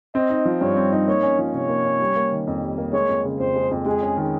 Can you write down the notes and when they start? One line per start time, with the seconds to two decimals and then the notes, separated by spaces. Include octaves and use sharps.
0.15 C4 D#5
0.30 D#4
0.45 F3
0.61 G2 C#5
0.77 C4
0.92 D#4
1.07 A#3 C#5
1.23 C#4
1.39 F3
1.53 C3 C#5
1.69 A#3
1.85 C#4
2.00 G3
2.16 A#3
2.32 D#3
2.47 F2
2.62 G3
2.78 A#3
2.93 G#3 C#5
3.09 F2
3.25 C#3
3.40 F2 C5
3.55 G#3
3.71 F2
3.86 G#3 G#4
4.02 C#4
4.17 D#3